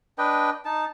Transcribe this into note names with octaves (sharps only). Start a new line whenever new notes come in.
D4 B4 D#5 G5
D#4 A5